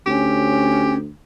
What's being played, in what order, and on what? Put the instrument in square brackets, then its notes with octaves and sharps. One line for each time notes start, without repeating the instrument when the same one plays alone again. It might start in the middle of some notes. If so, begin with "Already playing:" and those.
[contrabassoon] D2 [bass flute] C#4 [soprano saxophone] G4